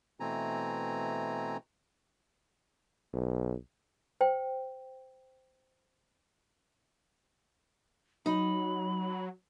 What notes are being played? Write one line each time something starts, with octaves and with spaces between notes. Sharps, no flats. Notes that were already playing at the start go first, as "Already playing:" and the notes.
B2 E3 A3 C4 G#5 A#5
B1
C5 G5
F#3 D#4 B5